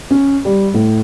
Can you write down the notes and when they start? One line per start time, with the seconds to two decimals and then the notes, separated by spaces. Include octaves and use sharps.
0.11 C#4
0.45 G3
0.74 A2